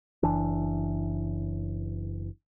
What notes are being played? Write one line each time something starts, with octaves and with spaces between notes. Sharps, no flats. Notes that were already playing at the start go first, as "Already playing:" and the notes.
F#1 E3 D4